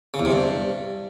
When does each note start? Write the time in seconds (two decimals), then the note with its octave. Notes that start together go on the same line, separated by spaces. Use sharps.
0.14 C#3
0.20 E2
0.25 C3
0.31 G2